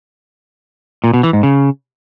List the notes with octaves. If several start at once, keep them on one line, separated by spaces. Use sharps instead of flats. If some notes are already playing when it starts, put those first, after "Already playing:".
A#2
B2
E3
G#2
C#3